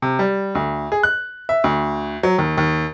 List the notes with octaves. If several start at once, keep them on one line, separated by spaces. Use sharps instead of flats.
C3
G3
D2
G#4
F#6
E5
D2
F#3
D#2
D#2